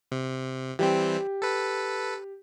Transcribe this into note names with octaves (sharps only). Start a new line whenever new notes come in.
C3
E3 G3 C4 G4
A4 B4